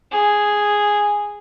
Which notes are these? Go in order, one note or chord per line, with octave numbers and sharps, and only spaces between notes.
G#4